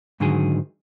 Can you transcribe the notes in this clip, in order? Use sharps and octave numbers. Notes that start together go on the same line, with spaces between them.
G#2 D3 D#3 F#3 G#4